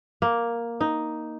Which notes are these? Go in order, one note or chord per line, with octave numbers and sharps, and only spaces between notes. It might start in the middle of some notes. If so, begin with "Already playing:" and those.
A#3
D#4